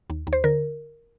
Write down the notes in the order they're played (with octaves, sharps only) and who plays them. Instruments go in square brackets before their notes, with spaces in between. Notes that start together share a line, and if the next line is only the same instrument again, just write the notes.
[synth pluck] D#2
D#2
C5
D3 A#4